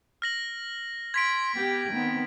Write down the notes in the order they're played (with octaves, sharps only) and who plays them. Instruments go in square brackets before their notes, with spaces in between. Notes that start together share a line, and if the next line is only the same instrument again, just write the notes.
[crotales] F6 A#6 F#7
[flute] C6 [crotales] G#6 B6 D7
[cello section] B3 G4 [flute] G5
[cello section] D#3 B3 C4